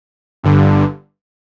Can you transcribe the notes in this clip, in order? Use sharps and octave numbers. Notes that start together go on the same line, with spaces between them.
G1 G2 D3